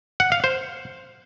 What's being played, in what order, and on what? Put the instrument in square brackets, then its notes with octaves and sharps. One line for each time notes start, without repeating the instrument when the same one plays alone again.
[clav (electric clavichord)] F#5
F5
C5